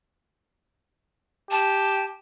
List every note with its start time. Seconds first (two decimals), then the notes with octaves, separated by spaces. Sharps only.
1.51 G4 A5